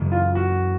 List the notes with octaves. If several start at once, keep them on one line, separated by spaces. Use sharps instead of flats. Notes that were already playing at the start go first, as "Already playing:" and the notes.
Already playing: F#2 C#3 E3
F4
F#4